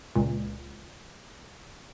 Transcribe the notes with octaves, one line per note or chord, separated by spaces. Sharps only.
C#2 A#2